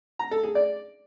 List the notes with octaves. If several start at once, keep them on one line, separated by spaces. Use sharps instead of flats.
A#5
A4
G#4
D5